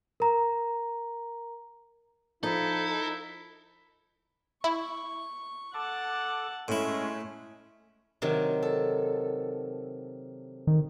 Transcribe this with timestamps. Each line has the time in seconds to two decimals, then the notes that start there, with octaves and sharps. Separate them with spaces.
0.20 A#4 A#5
2.43 F3 D#4 E4 A4
4.64 E4 C#6
5.74 A4 F#5 A5 D6
6.68 A2 G#3 A3 C#4 E4
8.22 C3 D#3 F#3
8.63 A4
10.67 D#3